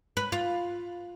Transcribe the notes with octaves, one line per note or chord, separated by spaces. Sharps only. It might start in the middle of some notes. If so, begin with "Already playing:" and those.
B4
F4